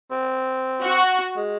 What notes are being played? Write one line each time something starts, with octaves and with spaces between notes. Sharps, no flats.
C4
F#4
G#3